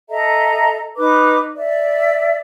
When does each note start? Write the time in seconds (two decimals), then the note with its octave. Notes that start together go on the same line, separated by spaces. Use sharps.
0.10 A4 D#5 E5 A#5
0.97 D#4 B4 D6
1.56 D5 E5